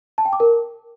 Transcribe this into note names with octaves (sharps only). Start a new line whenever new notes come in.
A5
G5
D6
A#4